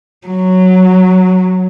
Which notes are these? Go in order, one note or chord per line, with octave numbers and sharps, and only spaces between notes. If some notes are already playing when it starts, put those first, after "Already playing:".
F#3